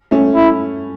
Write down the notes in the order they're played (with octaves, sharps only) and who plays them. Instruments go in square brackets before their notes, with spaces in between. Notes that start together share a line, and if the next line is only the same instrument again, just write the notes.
[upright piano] A3 C#4
[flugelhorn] E4